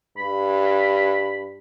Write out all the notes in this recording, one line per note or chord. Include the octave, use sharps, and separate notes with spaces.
G2 B5